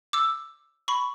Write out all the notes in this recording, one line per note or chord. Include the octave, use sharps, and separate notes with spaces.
D6 E6
B5 C#6